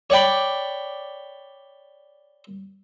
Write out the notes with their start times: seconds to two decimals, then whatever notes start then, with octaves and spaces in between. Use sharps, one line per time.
0.10 C#5 D5 G5 B5